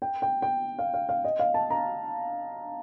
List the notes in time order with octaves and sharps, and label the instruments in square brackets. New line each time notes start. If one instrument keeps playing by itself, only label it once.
[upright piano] G5
G5
G5
F5
F5
F5
D#5
F5
A5
A#5